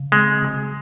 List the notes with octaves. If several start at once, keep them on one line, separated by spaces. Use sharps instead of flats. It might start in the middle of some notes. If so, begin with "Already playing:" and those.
Already playing: C#3
G#3 C4
C#3